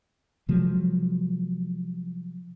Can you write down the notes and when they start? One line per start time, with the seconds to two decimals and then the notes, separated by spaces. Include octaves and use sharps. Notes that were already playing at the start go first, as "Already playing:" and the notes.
0.49 C3 F3 F#3 G#3